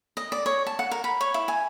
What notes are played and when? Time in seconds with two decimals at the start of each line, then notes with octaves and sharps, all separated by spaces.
0.17 D#5
0.32 D5
0.46 C#5
0.67 A5
0.79 F#5
0.91 A#4
1.04 B5
1.21 C#5
1.34 E4
1.48 G#5